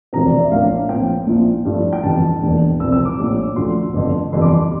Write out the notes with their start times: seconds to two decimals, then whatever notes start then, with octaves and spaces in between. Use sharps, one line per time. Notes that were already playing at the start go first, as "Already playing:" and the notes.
0.13 E1 D2 C3 F3 C4 A#5
0.26 D5
0.38 E5
0.51 A#1 A2 F3 A#3 D4 F5
0.89 A#1 A2 F3 C4 G5
1.27 A#1 A#2 F3 C4 E4
1.65 G2 F3 A3 E4
1.93 G5
2.03 G1 F2 E3 G3 A5
2.42 E1 E2 E3 A#3 D4
2.80 C2 C3 F3 C4 E6
2.92 E6
3.05 D6
3.17 A#1 A2 G3
3.56 D2 D3 F3 A3 C6
3.94 G1 F2 D3
4.33 G1 F2 C3 E3 G3 C6
4.42 D6
4.52 C6